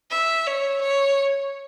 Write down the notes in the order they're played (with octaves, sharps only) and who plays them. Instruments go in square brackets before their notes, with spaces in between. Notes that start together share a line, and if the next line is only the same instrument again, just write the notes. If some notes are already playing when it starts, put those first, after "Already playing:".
[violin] E5
C#5
C#5